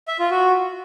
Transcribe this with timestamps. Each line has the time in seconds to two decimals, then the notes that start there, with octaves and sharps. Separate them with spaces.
0.08 E5
0.19 F4
0.31 F#4